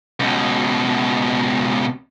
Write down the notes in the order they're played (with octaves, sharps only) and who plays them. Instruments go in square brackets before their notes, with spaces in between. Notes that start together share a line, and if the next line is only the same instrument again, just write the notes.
[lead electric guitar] C#2 B2